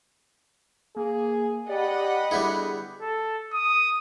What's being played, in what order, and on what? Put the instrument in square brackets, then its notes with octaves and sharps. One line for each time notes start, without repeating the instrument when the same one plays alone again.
[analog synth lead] A#3 [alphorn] G#4
[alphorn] G4 [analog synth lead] D5 [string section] D#5 F#5 B5
[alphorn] D3 [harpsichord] G3 B3 E4 [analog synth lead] G#4
[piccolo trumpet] A4
D#6